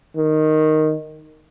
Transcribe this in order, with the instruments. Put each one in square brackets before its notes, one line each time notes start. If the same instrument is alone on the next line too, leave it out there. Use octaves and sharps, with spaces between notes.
[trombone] D#3